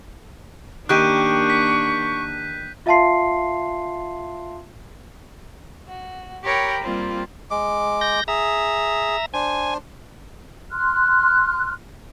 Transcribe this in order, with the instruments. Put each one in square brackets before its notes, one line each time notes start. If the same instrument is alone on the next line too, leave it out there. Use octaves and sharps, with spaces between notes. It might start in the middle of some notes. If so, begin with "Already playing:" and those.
[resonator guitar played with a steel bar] D#3 G4 [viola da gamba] A#3 D4 [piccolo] C#6 [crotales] F#6 G6 D#7
[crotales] B6
[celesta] F4 E5 F5 A5 C6 C7
[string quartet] F#4
G4 A#4 C#5 G5 A#5 B5
G3 A#3 C4 F4
[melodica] G#3 D6
[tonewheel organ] G6 A#6
[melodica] G#4 [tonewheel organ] E5 A#5
[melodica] D4 C5 [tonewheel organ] G#5
[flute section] C6 F6 F#6